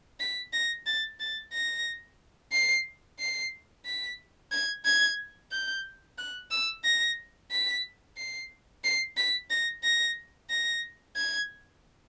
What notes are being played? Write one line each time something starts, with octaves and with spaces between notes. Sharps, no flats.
B6
A#6
A6
A6
A#6
C7
C7
B6
G#6
G#6
G6
F#6
E6
A#6
B6
C7
C7
B6
A#6
A#6
A#6
G#6